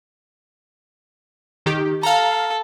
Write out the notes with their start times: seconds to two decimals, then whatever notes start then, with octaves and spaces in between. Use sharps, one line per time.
1.66 D#3 G4
2.03 A4 F5 A#5